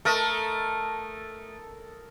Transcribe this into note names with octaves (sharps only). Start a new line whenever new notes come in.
A3 A4 A#4 D#5